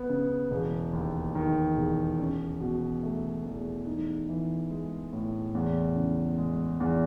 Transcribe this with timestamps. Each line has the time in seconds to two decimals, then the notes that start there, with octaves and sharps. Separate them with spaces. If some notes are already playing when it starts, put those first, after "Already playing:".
Already playing: B3
0.09 C#3
0.51 E1
0.93 D#2
1.35 D#3
1.76 E1
2.19 C#4
2.60 B2
3.03 A3
3.44 E2
3.87 D#4
4.29 E3
4.71 G#3
5.13 A2
5.55 E2
5.96 C#3
6.38 G#3
6.80 E2